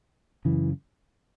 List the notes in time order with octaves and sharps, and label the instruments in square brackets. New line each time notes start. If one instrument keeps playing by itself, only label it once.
[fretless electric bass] F#2 C#3 E3